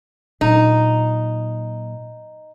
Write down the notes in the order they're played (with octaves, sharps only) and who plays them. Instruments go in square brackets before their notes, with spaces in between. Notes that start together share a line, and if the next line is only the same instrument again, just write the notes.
[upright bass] A#2 F#3 [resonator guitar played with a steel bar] D#4